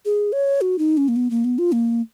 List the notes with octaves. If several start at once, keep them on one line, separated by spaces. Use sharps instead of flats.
G#4
C#5
F#4
D#4
C#4
A#3
B3
A#3
B3
F4
A#3